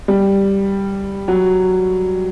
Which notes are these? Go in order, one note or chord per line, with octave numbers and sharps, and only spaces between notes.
G3
F#3